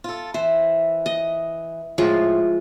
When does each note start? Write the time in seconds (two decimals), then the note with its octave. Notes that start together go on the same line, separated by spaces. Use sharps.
0.04 F4 A4
0.34 E3 C5
1.06 D#5
1.98 A2 F3 G#3 F4